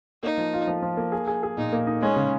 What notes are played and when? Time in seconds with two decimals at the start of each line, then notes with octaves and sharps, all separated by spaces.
0.23 A#3 D#4
0.38 F3
0.53 F4
0.67 F3
0.82 F3
0.97 A#3
1.12 G#4
1.27 G#4
1.43 G#4
1.57 A#2 D#4
1.73 A#3
1.87 D#4
2.01 G#3 C#4
2.16 C#3